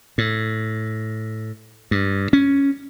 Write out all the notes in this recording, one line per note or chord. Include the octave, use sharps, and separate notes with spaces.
A2
G2
C#4